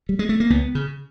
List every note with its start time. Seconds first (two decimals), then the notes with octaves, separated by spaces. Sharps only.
0.09 G3
0.19 G#3
0.29 A3
0.40 A#3
0.50 C#2 B3
0.75 C#3